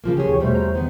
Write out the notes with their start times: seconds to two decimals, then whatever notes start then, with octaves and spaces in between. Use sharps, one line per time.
0.04 C#3 F3 A#3 F4
0.17 G4 G#4 C#5
0.29 D#2 C3 E3
0.40 E2 B2 G3 A3 C5
0.53 E2 A#5
0.75 D#3 B3